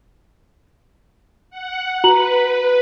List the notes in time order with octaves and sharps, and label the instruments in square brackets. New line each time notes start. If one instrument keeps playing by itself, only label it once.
[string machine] F#5
[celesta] F#4 A#5 F#7 [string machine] B4